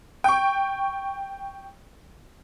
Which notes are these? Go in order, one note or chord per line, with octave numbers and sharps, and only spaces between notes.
G5 C#6